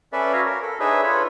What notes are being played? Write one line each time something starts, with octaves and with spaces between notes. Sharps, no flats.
C#4 A4 B4 D5 E5
F#4 C#5 F5 A#5
A#4
A4
D4 D#4 G#4 B4 C#5 E5
F4 A4 B4 C#5